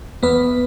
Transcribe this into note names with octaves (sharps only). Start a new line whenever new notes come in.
E2 B3 B4